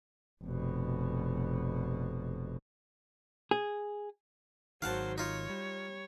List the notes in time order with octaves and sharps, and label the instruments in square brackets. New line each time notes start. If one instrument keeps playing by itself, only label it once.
[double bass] F1 B2
[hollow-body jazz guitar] G#4
[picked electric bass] G#1 D#3 [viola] F#3 C5 [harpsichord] F5 F#5 A5
[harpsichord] D#4 F4 [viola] C#5
[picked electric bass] G3